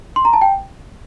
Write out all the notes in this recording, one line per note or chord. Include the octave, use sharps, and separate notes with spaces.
C6
A#5
A5
G5